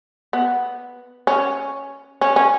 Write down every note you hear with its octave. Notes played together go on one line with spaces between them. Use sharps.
B3
C#4
C#4
C#4